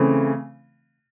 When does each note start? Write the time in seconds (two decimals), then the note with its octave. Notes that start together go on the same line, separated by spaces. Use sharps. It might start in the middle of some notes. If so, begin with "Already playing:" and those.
Already playing: C#3 E3 A3 C4